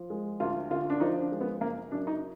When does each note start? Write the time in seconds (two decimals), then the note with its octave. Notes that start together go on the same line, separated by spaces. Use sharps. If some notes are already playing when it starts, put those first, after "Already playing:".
Already playing: F3
0.10 G#3
0.40 D2 F4
0.71 D3 F4
0.90 D4
1.00 F3 D#4
1.21 D4
1.32 G#3
1.41 B3
1.61 F#1 A#3
1.91 F#2 D4
2.07 D#4